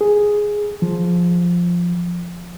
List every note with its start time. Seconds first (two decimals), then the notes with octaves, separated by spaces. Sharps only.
0.01 G#4
0.82 F3